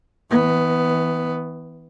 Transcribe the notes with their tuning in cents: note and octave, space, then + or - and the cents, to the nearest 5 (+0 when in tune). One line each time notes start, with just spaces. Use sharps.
E3 -30 B3 +10